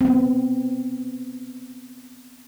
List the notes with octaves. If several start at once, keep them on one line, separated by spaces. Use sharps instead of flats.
B3 C4